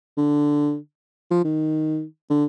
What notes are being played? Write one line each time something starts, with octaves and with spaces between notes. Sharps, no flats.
D3
F3
D#3
D3